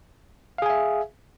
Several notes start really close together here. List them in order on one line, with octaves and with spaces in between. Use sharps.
F5 G#4 G#5 E5